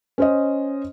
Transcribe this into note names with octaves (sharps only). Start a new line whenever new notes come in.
C#4 C5 D#5